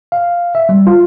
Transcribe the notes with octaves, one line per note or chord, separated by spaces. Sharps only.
F5
E5
G3
F4